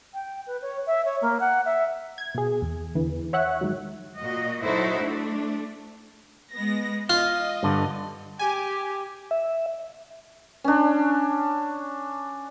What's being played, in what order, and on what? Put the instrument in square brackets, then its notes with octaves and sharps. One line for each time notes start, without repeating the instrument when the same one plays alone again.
[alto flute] G5
B4
C#5
E5
C#5
A#3
F#5
E5
[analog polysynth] G#6
B2 G#4
E2
E2 D3 E3
C#5 E5 F#5 F#6
G#2 D#3 F#3
[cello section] A#2 F#4 D#5
F#3 D#4 E4 F#4 A4 C5
A3 D4
[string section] G#3 B3 A#6
[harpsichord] F4 [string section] D#5
[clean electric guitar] G2 D3
[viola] G4 [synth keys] G#5
[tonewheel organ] E5
[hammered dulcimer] C#4 D4